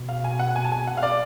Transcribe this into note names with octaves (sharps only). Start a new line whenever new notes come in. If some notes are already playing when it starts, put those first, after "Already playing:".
Already playing: B2
F5
G#5
F#5
G#5
A5
G#5
F#5
F5
D5